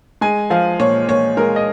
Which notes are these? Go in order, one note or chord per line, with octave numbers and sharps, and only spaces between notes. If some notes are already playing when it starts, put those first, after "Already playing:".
G#3 G#5
F3 F5
A#2 C#5
A#2 C#5
G#3 A#4
D#5